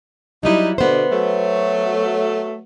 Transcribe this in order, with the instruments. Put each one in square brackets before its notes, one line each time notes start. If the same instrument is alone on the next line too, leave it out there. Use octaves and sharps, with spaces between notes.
[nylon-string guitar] F#3 G3 E4 [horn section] D#4
[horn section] B2 D3 [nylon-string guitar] B3 C5
[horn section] F#3 A3